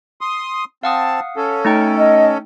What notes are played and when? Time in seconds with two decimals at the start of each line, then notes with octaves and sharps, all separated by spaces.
0.21 C6 D#6
0.83 C4 F5 F#5 A5 D#6
1.37 C#4 A4
1.65 A3 D#4 G5
1.97 D#5